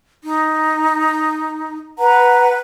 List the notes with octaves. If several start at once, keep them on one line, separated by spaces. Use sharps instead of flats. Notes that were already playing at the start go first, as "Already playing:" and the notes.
D#4
B4 F#5 A#5